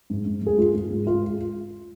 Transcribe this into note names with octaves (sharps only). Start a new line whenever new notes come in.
G#2
G#2
G#2 G#4
G#2 F4
G#2
G#3
G#3 F4